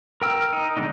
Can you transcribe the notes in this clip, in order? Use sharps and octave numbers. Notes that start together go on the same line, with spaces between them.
A#4 G5 E6 F6
D#4
D#3 G#3 D4 D#4